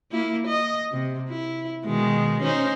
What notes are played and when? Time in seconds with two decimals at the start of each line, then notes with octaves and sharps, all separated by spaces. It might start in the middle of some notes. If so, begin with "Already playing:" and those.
0.12 A#3 E4
0.48 D#5
0.92 C3
1.29 E4
1.86 B2 D#3 G#3
2.43 C#4 D#4 C5